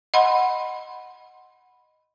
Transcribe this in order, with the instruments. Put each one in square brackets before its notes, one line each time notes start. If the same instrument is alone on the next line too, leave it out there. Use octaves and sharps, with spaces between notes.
[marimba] D#5 F#5 B5 C6